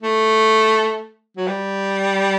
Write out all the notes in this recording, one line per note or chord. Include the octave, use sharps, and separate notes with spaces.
A3
F#3
G3